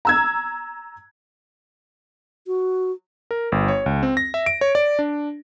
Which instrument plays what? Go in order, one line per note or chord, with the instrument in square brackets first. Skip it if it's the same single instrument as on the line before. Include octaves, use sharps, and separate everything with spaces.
[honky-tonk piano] A#5 E6 G#6
[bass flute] F#4
[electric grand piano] A#4
G1
C#5
C#2
C4
A#6
E5
D7
C#5
D5
D4